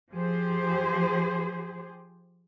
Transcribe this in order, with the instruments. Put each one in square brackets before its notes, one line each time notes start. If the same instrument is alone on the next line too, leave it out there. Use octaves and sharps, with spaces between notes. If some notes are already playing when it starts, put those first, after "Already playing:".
[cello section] F3 G4 G#4 C5